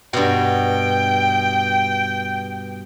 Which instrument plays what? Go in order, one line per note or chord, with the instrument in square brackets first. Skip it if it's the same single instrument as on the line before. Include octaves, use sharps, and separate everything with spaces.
[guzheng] G2 B2 [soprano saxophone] G5